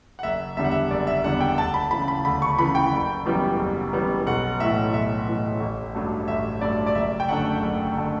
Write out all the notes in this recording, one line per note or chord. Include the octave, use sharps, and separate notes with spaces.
F#5
F#1 E5
E2 D3 G3 E5
F#5
E5
F#1 D5
E5
E2 D3 G3 F#5
G5
D2 A5
B5
C#3 E3 B5
B5
D2 B5
C#6
C#3 E3 B5
G5
F#1
F#2 E3 G3 B3
F#1
F#2 E3 G3 B3
B1 F#5
A2 E3 E5
B1 E5
A2 E3
A1
G2 F#3 A3
A1 E5
G2 F#3 A3 D5
D5
F#1 E5
G5
F#2 D3 A3 F#5
F#1
D3 A3